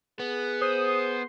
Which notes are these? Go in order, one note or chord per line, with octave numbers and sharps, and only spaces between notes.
B3 G#4
C5 D#6